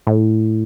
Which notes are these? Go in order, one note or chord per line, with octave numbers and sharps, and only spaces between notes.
A2